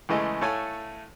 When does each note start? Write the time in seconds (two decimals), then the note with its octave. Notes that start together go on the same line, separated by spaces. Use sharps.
0.09 E2 C#3 E3 G#3 A3 D#5
0.41 A2 A3 A4 C#5 F5 G#5